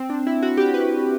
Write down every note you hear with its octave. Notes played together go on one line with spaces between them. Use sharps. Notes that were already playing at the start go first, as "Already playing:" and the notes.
Already playing: C4
D4
E4
F#4
G4
B4